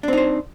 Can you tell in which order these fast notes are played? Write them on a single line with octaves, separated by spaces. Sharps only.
D4 C4 D#4 C5